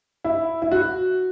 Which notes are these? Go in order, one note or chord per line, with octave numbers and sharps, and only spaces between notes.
E4
E4
F#4